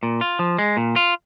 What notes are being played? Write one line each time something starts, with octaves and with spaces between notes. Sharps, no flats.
A#2
F4
F3
G#3
A#2
F4